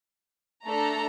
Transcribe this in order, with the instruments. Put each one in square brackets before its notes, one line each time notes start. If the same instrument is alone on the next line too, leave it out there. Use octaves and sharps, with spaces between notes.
[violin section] A3 D4 A4 A#5